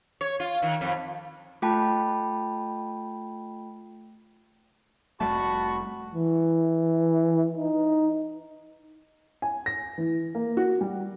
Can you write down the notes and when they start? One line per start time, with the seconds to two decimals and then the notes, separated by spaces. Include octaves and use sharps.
0.21 C#5
0.40 F4
0.62 D#3
0.81 F2
1.62 A3 F4 G5 A5 B5
5.21 F1 G3 A3 F#4 A5 B5 C#6
6.14 E3
7.57 D#4
9.42 G#5
9.66 A#6
9.98 E3
10.35 A#3
10.57 F#4
10.81 G3